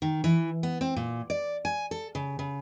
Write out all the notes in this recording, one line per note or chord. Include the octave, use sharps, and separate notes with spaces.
D#3
E3
B3
C4
A#2
D5
G#5
A4
C#3
C#3